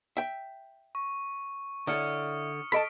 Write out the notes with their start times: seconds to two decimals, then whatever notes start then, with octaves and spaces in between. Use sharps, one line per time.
0.17 E5 G5
0.95 C#6
1.87 D3 E4 A4 C#5 D#6 F6 C#7
2.72 A4 D#5 A5 B5 B6 D7